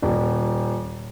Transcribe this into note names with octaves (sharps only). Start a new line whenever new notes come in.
D#1